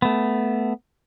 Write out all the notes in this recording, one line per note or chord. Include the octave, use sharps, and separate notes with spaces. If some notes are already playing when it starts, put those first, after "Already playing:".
A3 B3